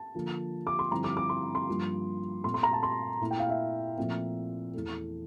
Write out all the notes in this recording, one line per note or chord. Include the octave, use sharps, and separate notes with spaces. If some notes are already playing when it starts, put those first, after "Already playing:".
Already playing: A5
D3 F3 A#3 F4
D6
C6
G2 D3 F3 C4 E4 A#5
D6
D6
C6
C6
G2 F3 A#3 F4
A#2 A3 C4 C6
C6
A#5
A5
C6
A#2 A3 E4
G5
F5
E5
A#2 F3 A3 C4
E2 E3 A3